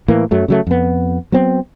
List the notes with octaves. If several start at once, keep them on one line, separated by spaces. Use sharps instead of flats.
A2 E3 A#3
F#2 F#3 A3
C#3 F#3 A3
F2 B3
F#3 B3 C4